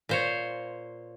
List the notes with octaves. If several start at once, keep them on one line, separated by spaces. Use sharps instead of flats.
A#2 C5 C#5